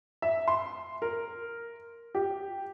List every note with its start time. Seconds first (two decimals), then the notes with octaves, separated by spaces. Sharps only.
0.22 E5
0.48 C6
1.02 A#4
2.15 G4